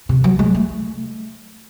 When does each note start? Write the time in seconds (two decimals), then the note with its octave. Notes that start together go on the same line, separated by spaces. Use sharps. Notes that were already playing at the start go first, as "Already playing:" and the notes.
0.09 C3
0.24 F#3
0.39 G#3
0.55 A3